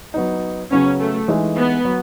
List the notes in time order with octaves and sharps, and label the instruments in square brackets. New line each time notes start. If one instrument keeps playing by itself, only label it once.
[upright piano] F#3 B3 D#4
[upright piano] C#3 F#3 B3 [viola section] C#4
[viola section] A3
[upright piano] E3 G#3 D#4
[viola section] B3
[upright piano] F#3